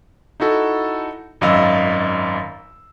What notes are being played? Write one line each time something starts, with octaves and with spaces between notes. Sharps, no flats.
D#4 E4 F#4 A4
G#1 F#2 D#5 F5 B5 E6